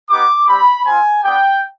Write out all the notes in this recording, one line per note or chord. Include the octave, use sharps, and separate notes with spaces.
B3 D#4 G4 D6
G3 C4 G4 B5
C4 F4 G#5
B3 D4 G4 G5